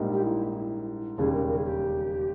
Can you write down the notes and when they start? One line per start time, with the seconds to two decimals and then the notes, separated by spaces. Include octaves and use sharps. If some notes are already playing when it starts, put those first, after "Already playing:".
Already playing: A#1 G#2 G3 A#3 D#4
0.13 G4
0.23 E4
1.18 E1 D#2 C#3 G3 G#4
1.33 A#4
1.49 A#4
1.58 G#4
1.65 G4